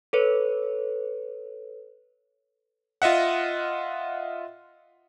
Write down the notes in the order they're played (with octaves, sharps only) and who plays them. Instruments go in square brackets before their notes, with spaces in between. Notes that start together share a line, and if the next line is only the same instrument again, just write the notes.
[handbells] A4 B4 C#5
[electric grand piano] F4 D#5 E5 F#5